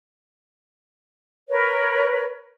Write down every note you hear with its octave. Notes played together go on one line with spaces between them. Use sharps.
A#4 B4 C#5